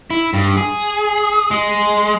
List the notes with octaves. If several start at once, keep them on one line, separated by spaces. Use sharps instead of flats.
E4
G2
G#4
G#3